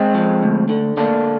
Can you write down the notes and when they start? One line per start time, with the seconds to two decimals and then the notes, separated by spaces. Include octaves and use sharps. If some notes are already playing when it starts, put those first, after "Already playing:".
Already playing: G#3 C4
0.15 F3
0.43 D2
0.69 D3
0.97 D3 A#3 D4